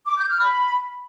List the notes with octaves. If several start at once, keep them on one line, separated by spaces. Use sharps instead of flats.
D6
G6
F6
B5